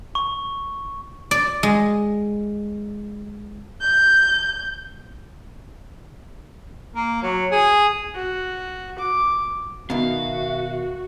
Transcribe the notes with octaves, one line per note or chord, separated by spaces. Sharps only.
C#6
D5
G#3
G6
A#3
F#3
G#4
F#4
D6
B2 D#3 F#4 E5 F5